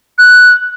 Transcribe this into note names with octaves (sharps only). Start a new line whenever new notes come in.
F#6